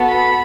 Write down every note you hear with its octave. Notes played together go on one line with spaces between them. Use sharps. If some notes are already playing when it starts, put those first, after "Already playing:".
Already playing: B3 F#4 A4
B5